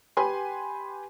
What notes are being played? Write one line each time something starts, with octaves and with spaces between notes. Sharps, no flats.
G4 B4 G#5 C6